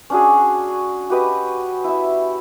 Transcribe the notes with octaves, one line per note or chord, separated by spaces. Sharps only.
C#4 D4 F#4 G#4
F#4 G4 B4 D#5
E4 E5